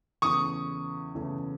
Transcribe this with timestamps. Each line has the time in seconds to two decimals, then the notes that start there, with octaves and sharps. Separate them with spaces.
0.22 E2 C#3 E3 A3 C#6 D#6
1.15 E2 C#3 E3 A3